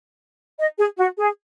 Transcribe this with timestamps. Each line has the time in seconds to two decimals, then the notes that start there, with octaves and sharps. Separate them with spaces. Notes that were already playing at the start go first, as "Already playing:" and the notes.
0.60 D#5
0.79 G#4
0.98 F#4
1.18 G#4